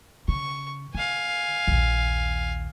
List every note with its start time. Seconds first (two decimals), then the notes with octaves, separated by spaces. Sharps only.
0.28 C#3 C#6
0.94 D3 F5 G#5
1.67 A#1 D#2